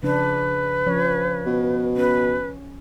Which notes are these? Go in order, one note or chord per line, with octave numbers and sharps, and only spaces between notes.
C#3 F3 D4 B4
F3 C#4 C#5
B2
C#4 B4